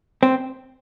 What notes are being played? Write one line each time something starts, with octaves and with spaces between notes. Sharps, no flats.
C4